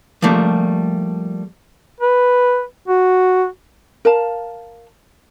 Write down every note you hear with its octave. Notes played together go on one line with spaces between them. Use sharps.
F3 G3 A3 A#3
B4
F#4
A#4 F5 A5